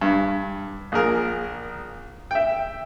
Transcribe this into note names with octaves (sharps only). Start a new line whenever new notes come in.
G2
A#1 G#4 A#4
E5 G5